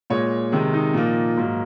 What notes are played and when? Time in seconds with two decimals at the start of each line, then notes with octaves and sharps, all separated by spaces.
0.10 A#2 G#3 C#5
0.52 C3 D#3 G#3
0.73 D#4
0.94 A#2 F3 A#3
1.37 G#2 F#3 A#3